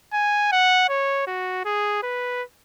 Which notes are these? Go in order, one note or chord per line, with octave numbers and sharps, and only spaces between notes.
G#5
F#5
C#5
F#4
G#4
B4